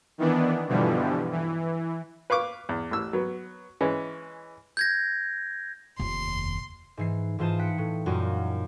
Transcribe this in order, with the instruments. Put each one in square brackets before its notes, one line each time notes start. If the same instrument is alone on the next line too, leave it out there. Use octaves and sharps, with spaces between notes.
[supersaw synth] D#3 E3 B3 D4
G2 B2 D3 E3 F3 G3
E3
[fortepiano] B4 F5 C#6 D6
E2
A1 E6
F#3 B3
E3 G#3 C#4
[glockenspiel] G6 G#6 A#6
[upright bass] F1 D#2 [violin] C6
[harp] G#2 E3 C7
G#2 E3 F4 C5 A5 D#6
G5 F#6 B6 C#7
A2
F#2 A#2 G3 D#4 F4 F#4